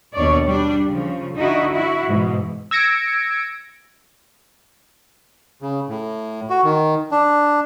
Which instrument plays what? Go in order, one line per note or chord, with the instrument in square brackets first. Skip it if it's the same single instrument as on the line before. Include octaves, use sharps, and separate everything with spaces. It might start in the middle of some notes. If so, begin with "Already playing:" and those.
[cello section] D#2 B2 D4 C#5 D5
G3 D4 D5
C#3 F3
D3 D#4 E4 F#4
E4 F#4
G#2 B2 E3
[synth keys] E6 G#6 A#6 C#7 D7
[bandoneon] C#3
A2
F#4
D#3
D4